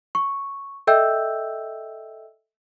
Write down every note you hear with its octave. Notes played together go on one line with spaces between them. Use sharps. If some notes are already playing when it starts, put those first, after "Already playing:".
C#6
A4 D#5 E5 G5 E6 G6